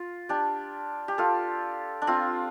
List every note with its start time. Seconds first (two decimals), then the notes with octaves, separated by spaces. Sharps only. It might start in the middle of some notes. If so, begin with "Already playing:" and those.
Already playing: F4
0.29 D4 G4
1.08 G4
1.18 F4 A4
2.02 D4
2.07 C4 F4